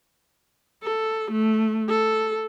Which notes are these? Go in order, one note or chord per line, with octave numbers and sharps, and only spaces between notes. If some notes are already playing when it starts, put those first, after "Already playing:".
A4
A3
A4